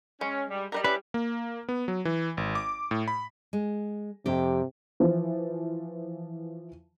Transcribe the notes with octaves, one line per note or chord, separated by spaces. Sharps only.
G#3 C#4
G3
G3 A#4 B4 D#5
C#4 E4 B4 D5
A#3
B3
F#3
E3
G#1
D6
A2
B5
G#3
F2 C3 G4
E3 F3